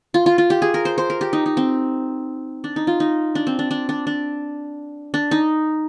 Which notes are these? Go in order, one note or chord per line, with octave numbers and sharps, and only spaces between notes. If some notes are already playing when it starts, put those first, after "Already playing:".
F4
F4
F4
G4
G#4
A#4
C5
C5
A#4
G4
D#4
D#4
C4
D4
D#4
F4
D#4
D4
C4
D4
D4
D4
D4
D4
D#4